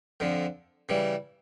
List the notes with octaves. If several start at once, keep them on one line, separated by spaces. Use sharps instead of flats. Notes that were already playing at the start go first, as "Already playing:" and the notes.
F2 D3 F3
C#3 E3 G3